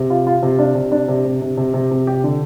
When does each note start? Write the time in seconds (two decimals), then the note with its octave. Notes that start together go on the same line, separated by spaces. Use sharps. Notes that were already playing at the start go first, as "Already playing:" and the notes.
Already playing: C3
0.10 F4
0.27 F4
0.43 C3
0.59 D4
0.75 C3
0.92 D4
1.08 C3
1.25 C3
1.42 C3
1.57 C3
1.74 C3
1.91 C3
2.07 G4
2.24 D3